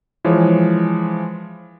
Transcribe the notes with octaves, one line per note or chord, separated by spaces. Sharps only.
E3 F3 G#3 C#5